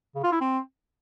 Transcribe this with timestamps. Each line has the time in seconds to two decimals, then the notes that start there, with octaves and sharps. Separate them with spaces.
0.15 C#3
0.24 F4
0.32 E4
0.41 C4